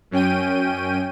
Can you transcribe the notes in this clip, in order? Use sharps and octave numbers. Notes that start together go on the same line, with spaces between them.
F#2 C#4 G5 D#7